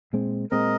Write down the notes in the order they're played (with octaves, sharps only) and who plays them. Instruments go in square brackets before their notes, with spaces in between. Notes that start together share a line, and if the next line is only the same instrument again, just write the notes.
[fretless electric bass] A#2 G#3 C4
[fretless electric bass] A#2 G#3 C4 [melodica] A#4 D#5